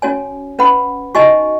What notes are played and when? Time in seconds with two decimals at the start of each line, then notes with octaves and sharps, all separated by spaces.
0.02 C#4 F#4 C#5 G#5
0.59 C#4 B4 F#5 B5
1.15 D#4 F#4 D#5 G#5 C#6